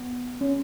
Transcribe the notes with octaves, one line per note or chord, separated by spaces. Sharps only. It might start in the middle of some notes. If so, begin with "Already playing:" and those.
Already playing: B3
C#4